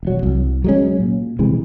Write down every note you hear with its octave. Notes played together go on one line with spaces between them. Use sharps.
E1 F#3
C2
F#3 G#3 C#4
A#2
C3 E3 G#3